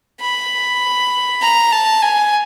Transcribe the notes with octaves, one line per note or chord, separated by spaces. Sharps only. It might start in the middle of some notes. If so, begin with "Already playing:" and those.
B5
A#5
A5
G#5